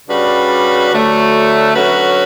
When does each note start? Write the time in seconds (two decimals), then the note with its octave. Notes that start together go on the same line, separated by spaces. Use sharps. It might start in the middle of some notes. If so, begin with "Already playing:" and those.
0.07 C#3 G3 D4 F#4 B4
0.91 D2 D3 F#3 A3
1.74 D3 F#3 C#4 F#4 B4